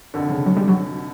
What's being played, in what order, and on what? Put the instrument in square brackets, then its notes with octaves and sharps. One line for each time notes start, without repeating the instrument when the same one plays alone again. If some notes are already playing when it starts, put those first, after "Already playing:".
[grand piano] F1 F2 D3
[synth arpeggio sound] C#3
F#3
G3
F#3